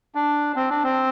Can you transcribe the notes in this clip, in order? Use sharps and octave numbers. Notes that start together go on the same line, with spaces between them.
D4
C4
D4
C4